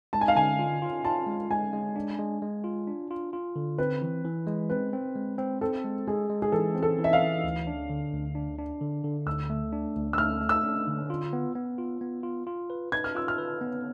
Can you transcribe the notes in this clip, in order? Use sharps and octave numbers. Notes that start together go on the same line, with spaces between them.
G#3 A5
G#5
F5
D3 G#5
F4
F4
F4 A5
G#3
G#3 G#5
G#3
D4
G#3
G#3
F4
D4
F4
F4
D3
C4 B4
E3
E3
G#3
C4 B4
C4
G#3
C4
C4 A4
G#3
G#3 G#4
G#3
G#4
E3 A4
C4
A4
E3
E5
F5
E3
D2
D4
D3
D2
D4
D4
D3
D3
D2 E6
A3
D4
D2
E6
A3 F6
A3
E6
D4
D3
F4
B3
B3
F4
B3
F4
F4
B4
B4 G#6
F6
F4 E6
F6
B4
B3